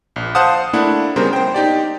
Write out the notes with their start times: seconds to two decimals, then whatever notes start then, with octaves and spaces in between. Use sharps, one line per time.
0.16 A#1
0.35 C5 F5 F#5 A5 D#6
0.73 A3 A#3 D4 E4 F#5
1.16 C#3 G3 B3 A#4 C5
1.33 C5 G5
1.54 D#4 G4 D5